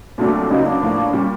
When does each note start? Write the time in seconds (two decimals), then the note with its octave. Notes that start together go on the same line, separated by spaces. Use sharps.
0.18 C2 A#2 F#3 A3 D4
0.50 C#2 C#3 F#3 A#3 D#4
0.66 D4
0.82 A2 F3 A#3
1.13 A#2 G3 C#4